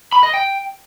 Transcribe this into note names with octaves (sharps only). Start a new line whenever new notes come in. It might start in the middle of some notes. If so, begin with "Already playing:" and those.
B5
D#5
G5